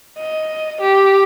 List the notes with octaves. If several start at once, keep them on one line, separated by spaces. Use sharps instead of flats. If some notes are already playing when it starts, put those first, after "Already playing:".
D#5
G4